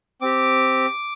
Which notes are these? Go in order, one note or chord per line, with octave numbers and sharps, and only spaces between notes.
C4 G4 D6